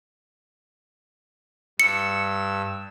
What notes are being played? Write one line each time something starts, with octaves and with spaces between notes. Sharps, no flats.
G2 E6 C#7